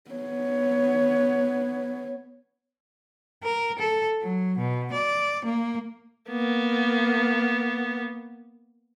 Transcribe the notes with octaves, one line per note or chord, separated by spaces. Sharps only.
B3 C#5
A#4
A4
F#3
B2
D5
A#3
A#3 B3